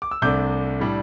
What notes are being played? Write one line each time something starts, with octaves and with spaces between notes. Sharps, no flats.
D6
E6
C2 C3 A3 D4 D6 G6
A2 G3 D4